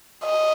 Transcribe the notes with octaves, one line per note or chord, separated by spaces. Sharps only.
D#5